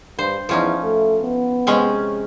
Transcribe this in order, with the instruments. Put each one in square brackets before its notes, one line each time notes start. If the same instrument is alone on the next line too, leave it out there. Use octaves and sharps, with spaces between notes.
[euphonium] G2 [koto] C5
[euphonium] E2 [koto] F3 C#4 D#4
[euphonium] A3
B3
[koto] C3 G#3 C#4